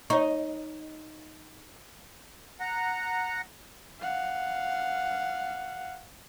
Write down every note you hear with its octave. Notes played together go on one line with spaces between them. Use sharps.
D#4 C#5 C#6
F#5 A#5
F5 F#5